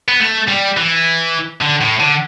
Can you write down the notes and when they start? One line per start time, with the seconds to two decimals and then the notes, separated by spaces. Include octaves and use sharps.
0.08 B3
0.20 A3
0.48 G3
0.77 E3
1.62 D3
1.81 A2
2.00 D3